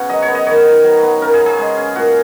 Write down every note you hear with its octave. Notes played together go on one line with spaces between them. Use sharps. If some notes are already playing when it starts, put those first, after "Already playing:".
Already playing: C#3 B3 F#4 F#5
F#3 D#5
C#5
B3
D#5
D#3 C#5
D#3
F#3
B3
C#3 A#4
G#4
C#3
G#4
G#3
C#4
A#2 F#4